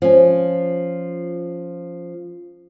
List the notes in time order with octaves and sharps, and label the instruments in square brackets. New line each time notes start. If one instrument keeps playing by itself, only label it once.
[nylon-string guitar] F3 C#4